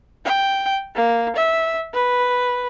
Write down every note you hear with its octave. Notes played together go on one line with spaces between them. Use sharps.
G5
A#3
E5
B4